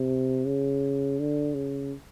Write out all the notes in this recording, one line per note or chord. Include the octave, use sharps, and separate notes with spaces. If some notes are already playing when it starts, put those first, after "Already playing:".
Already playing: C3
C#3
D3
C#3